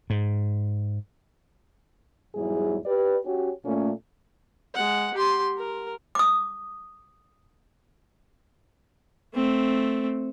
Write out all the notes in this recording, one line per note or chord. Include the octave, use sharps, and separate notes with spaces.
G#2
E2 G#2 F#3 G3 E4 G#4
G4 B4 D5
C#4 F#4 G4
A#2 A3 C#4
G#3 F#5
G4 C6
A#4
D6 D#6
A3 C4